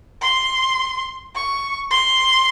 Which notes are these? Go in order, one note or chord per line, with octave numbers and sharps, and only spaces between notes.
C6
C#6
C6